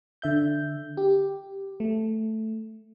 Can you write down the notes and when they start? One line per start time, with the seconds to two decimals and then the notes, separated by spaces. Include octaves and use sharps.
0.22 D3 E5 G6
0.97 G4
1.80 A3